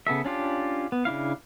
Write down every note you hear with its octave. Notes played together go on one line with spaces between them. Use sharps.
C#3 B3 A4 E5
C#4 D4 F4 G4
B3
C#3 D4 E4 F5